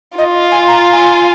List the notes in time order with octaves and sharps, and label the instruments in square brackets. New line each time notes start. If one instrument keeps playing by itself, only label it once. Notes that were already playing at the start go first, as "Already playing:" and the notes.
[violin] F4 [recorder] D#5
[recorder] G#5
A#5
G#5